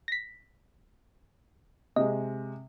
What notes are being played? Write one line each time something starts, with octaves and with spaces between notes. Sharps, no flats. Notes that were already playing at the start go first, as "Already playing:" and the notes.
A#6 B6
C3 G#3 D#5